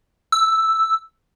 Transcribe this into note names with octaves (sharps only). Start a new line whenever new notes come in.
E6